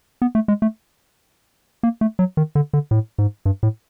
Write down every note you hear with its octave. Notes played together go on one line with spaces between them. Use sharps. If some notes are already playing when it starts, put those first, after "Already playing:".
B3
A3
G#3
A3
A#3
A3
F#3
D#3
D3
D3
A2
G#2
G2
A2